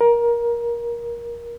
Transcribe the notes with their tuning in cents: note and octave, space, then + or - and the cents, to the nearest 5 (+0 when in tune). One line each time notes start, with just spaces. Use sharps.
A#4 +20